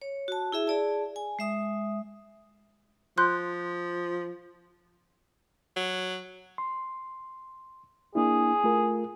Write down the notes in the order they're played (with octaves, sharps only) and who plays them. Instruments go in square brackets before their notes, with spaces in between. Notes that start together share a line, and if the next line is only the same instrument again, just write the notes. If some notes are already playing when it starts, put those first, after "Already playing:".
[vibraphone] C#5
F#4 A5
E4 G#4 E5
G#4 D5 A5
G#5
G#3 E5 D#6
[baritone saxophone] F3 [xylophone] C6 F#6 G6
[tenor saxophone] F#3
[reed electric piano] C6
[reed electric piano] A#3 D4 E4 [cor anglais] G#4
[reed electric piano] A3 F4 A#4